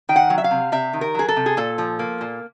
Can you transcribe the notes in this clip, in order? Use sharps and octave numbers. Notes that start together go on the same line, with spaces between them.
D#3 G5
F#5
F#3
E5
F5
C3
C3 E5
D#3
A#4
F#3 G#4
A4
C3
G#4
A#2 A4
F3
A#3
A#2